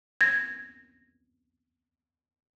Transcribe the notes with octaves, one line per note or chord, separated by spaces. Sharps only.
G#6 A#6